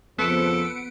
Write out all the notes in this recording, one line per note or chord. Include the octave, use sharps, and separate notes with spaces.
F2 C#3 F3 B3 A4 C#7 D7